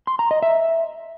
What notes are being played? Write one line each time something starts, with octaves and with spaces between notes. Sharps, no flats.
C6
A#5
D#5
E5